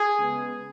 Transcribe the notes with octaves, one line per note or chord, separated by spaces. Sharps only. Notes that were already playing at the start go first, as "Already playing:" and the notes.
Already playing: G#4
C#3 G#3 B3